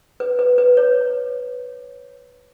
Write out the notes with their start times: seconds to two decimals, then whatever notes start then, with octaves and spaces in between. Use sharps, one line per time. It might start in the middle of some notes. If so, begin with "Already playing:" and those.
0.20 B4
0.39 B4
0.58 B4
0.77 C#5